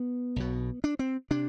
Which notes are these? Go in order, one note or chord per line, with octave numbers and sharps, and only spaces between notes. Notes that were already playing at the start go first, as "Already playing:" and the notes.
Already playing: B3
B1 B2
D4
C4
C3 D4